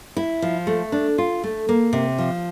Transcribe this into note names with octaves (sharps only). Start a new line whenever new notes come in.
E4
F3
A3
D4
F4
A3
A#3
C3
F3